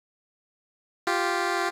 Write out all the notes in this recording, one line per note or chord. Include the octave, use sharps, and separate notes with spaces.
F4 G4